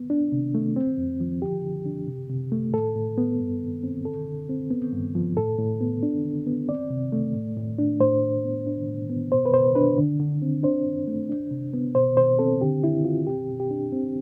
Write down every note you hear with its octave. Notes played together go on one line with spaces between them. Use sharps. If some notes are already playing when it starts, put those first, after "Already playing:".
Already playing: B3
D4
C3
A3
C4
F2
F3
D3 G4
D3
D4
C3
C3
A3
A2 A4
A2
B3
G2
G2
C4
D3 A4
D3
C4
B3
G2
F3
A2 A4
A2
B3
D4
D3
B3
C4 D5
C3
A3
A2
A2
D4
A2 C5
A2
B3
D4
A2
B3
B2 C5
B4
B2 C5
D4 B4
D3
D3
C4
D4 C5
G2
A3
D4
C3
B3
B2 C5
B2 C5
C4 A4
D3 G4
D3 E4
C4 F4
B2 G4
B2
G4
D4
C4